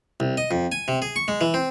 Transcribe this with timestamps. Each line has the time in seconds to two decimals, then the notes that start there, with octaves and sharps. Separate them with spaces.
0.20 C2
0.37 D#5
0.51 F2
0.72 G#5
0.88 C3
1.02 G#4
1.16 C#6
1.28 G#3
1.41 E3
1.54 C4